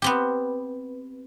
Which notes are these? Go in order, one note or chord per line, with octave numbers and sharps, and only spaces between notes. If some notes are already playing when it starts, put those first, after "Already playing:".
B3 C4 G4